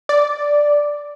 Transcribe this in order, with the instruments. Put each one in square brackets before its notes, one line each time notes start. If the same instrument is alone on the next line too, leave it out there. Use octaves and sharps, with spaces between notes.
[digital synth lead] D5